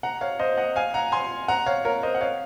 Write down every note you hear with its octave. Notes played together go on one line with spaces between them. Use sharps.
F#5 A#5
C#5 F5
C5 D#5
D#5 F#5
F5 G#5
F#5 A#5
G#5 C6
F#5 A#5
C#5 F5
A#4 C#5
C5 D#5
F#5
C#5 F5